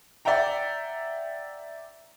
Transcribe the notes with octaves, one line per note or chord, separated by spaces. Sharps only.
D5 E5 F#5 G5 A#5